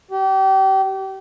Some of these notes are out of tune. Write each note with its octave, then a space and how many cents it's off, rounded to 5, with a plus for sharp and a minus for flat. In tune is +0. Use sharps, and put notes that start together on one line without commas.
G4 -30